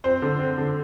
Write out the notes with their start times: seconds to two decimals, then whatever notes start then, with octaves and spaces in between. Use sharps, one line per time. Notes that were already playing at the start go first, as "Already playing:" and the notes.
0.04 C4 C5
0.22 D3
0.39 C4
0.58 D3